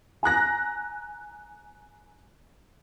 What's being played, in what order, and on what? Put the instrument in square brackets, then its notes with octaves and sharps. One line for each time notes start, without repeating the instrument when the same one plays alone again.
[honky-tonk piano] G#5 A#5 F#6 A#6